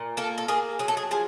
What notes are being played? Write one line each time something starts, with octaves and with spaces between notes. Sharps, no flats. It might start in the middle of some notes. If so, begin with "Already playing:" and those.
Already playing: A#2
A#3 A4
A4
A#3 G#4
F#3 G#4
A4
G#4
F3 G#4